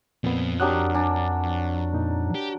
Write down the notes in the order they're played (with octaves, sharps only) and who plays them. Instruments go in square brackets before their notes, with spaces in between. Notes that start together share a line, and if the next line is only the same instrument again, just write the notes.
[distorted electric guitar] F2 [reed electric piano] A#2 B3
[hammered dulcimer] F#3 D4 A#4 [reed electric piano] G4 D#6 F#6
[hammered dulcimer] D4 [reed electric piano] G#5
[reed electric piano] A#2 D#4
[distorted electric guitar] G4